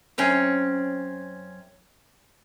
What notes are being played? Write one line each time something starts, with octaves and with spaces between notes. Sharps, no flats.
F#2 C4 C#4